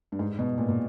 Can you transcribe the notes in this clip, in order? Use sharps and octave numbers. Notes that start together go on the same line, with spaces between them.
G2
G#2
B2
A#2
A#2